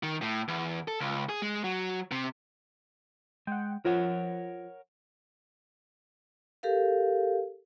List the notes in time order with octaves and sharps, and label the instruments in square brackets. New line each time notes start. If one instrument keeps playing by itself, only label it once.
[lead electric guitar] D#3
A2
E2
A4
C#2
G#4
G#3
F#3
C3
[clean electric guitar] G#3 [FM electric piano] F#5 G5
[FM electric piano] F3 [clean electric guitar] A#4 C#5 F#5
[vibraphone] G4 A4 A#4 F5